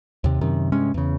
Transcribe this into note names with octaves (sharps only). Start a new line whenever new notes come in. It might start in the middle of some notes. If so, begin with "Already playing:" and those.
D#2 C3
F#2 C3 D#3
G2 C3 G#3 C#4
E2 C#3